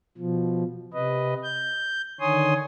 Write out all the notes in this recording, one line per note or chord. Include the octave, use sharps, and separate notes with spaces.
B2 F3
C3 B4 D#5
G6
D3 D#3 C#5 G#5 C6 D#6